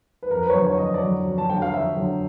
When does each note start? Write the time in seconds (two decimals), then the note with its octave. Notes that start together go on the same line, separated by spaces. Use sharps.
0.23 B4
0.31 F2 A#4
0.43 B4
0.50 C#5
0.54 D3 F#3 C5
0.67 C#5
0.78 F2 D#5
0.94 D5
1.02 D3 F#3
1.26 F2
1.38 A5
1.50 D3 F#3 G5
1.62 F5
1.73 F2 E5
1.96 D3 F#3